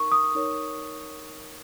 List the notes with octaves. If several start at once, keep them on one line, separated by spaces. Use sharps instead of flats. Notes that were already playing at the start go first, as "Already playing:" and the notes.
Already playing: D#4 A#4 C#6
D#6
D#4 A#4 C#5